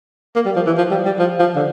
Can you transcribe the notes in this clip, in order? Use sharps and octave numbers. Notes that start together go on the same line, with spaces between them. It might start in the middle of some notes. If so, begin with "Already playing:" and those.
A#3
G3
F3
E3
F3
G3
G3
F3
F3
D3